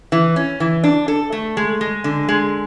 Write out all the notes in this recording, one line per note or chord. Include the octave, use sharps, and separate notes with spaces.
E3
C#4
E3
D4
A4
A3
G#3
G#3
D3
G#3